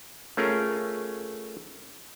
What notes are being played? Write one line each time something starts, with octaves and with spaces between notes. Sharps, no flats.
A3 C#4 F4 G#4 A#4